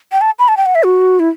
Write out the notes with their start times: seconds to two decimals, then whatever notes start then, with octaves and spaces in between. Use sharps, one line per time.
0.12 G5
0.21 A5
0.39 B5
0.48 A5
0.57 G5
0.66 F#5
0.75 E5
0.83 F#4
1.20 E4